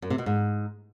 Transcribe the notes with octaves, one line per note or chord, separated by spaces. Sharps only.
F#2
C3
B2
G#2